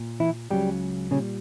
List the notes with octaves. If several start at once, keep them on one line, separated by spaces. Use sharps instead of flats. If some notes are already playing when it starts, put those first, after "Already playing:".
Already playing: A#2
E3 E4
C#2 C#3 F#3 G3 G4
A#2 C#3 G3 C#4